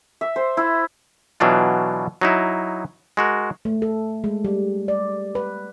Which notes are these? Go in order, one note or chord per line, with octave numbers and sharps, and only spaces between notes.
E5
C5
E4
B2 E3 F#3 D4 F4
F#3 D#4 E4
G#3 F#4 A#4
A3
A4
G#3
G3
D5
B4